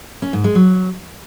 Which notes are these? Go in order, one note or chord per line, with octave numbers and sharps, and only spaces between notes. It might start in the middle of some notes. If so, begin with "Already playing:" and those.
C#4
G#2
G#3
F#3